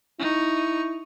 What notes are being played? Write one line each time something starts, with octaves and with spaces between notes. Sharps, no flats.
D#4 E4 C#6